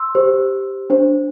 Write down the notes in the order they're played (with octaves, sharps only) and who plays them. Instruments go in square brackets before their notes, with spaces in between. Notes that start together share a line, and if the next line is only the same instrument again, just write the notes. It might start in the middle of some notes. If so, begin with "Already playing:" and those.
Already playing: [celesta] C6 E6
G4 C5
D4 C5